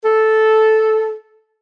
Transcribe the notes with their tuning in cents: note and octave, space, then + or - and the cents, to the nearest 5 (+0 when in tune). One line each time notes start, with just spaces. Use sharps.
A4 -10